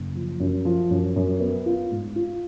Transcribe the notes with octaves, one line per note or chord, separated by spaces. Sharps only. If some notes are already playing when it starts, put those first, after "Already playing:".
Already playing: F#1
F3
F#2
F3
F#2
F#2
B3
F4
G#2
F4